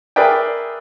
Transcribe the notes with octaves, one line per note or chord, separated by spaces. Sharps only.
G#4 A#4 B4 D5 E5 G5